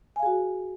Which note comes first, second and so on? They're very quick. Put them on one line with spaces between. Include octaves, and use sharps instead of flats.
G#5 F5 G#4 F#4